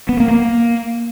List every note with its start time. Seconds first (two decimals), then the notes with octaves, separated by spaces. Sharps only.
0.09 B3
0.20 A#3
0.31 A#3